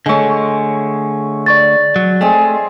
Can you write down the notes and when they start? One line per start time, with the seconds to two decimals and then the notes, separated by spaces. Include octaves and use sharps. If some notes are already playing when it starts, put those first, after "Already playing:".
0.06 D3 G#3 A3 C#5
1.46 D5 C#6 A6
1.96 F#3
2.21 G#3 A3 C4 G#4